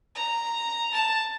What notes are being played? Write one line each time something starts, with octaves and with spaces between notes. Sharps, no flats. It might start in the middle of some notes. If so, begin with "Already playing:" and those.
A#5
A5